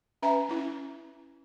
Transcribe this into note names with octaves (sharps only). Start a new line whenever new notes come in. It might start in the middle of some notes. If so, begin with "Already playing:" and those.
C#4 B4 E5 G#5 A#5
C#4 E4